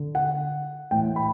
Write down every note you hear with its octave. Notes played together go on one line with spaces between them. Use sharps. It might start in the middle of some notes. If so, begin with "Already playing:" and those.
Already playing: D3
F#5
A2 E3 G5
B5